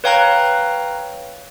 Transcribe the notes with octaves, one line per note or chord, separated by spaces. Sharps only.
B4 C#5 F5 G5 A#5 F#6